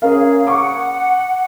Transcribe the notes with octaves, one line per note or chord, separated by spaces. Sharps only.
C#4 G#4 A#4 F5
F#5 C#6 D6